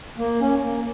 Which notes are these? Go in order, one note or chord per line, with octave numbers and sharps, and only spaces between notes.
A#3
C#4
A#3